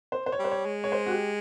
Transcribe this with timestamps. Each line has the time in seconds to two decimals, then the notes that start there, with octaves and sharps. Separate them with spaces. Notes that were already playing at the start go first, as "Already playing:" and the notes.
0.12 C5
0.26 C5
0.32 C#5
0.39 G3
0.44 C5
0.51 C#5
0.65 G#3
0.84 C#5
0.92 C5
1.06 F#4
1.11 G4